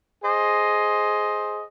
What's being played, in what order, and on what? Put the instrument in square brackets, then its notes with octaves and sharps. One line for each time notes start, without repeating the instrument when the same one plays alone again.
[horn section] G#4 C5 D#5